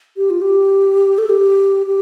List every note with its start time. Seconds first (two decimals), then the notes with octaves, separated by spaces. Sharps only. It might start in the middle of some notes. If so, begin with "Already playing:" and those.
0.17 G4
0.30 F4
0.42 G4
1.18 A4
1.29 G4
1.86 G4